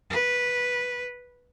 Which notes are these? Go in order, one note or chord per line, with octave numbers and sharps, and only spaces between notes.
B4